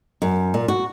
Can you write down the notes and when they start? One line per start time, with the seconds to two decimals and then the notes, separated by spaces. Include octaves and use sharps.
0.22 F#2
0.54 A#2
0.68 F#4